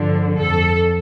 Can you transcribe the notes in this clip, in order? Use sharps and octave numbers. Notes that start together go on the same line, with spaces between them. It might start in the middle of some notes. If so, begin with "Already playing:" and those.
Already playing: G2 D3 F3
F2 A4